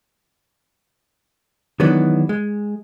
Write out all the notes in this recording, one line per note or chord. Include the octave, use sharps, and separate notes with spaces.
D#3 E3 F#3 G#3 B3 D4
G#3